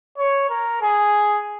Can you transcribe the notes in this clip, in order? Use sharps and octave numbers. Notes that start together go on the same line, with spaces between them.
C#5
A#4
G#4